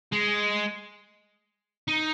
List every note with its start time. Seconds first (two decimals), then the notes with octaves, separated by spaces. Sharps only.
0.12 G#3
1.88 D#4